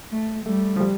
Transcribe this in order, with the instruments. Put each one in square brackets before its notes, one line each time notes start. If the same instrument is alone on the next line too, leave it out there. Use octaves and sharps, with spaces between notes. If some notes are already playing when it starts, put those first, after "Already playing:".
[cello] A3
[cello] G3 [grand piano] A3
[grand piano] F3
G3